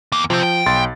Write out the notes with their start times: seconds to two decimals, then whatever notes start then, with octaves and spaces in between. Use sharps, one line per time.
0.12 E2 A#3
0.30 C3 F3 C4
0.43 G5
0.66 B1 C6 A6